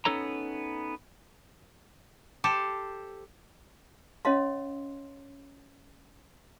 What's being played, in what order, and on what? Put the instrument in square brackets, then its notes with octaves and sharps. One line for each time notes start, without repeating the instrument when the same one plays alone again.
[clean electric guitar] B3 C#4 D#4 A4 C#5 A#5
[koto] G4 A4 C5
[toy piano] C#4 C#5 D#5 F5 C6